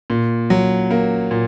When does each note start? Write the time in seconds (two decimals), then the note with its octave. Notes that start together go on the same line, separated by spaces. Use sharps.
0.10 A#2
0.50 F#3
0.91 A#3
1.31 A#2